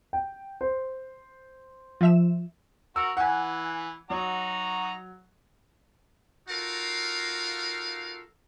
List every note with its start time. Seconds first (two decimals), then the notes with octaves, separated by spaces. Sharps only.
0.13 G5
0.61 C5
2.01 F3 E5 E7
2.96 F#4 A#4 E6
3.17 E3 F#5 G#5
4.10 F#3 D#4 F#4 A#5
6.49 D#4 F4 F#4 A4 A#4 F5